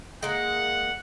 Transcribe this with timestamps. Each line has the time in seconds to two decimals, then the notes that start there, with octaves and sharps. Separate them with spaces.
0.23 G#3 A#3 F#5